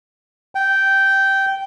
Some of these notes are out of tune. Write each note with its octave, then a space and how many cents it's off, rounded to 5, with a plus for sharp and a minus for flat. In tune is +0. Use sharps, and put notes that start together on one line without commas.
G5 -10